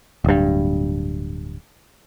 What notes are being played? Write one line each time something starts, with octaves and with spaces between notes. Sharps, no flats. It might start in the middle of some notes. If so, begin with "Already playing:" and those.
D1 G2